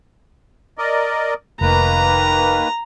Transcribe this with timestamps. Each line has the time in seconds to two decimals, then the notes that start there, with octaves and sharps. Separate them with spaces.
0.78 A#4 D5 D#5
1.61 F1 D#3 A#3 B4 A#5